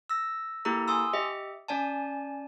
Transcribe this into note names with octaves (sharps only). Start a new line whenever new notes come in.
E6 A#6
A#3 E4 G4 A4 A#5
G#5 C6 D#6 E6
G4 D#5 E5
C#4 D5 G#5 A5